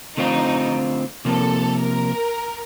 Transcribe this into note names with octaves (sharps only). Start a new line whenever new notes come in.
D3 A3 C4 D#4 F4
C3 F3 A#3 A4
A#4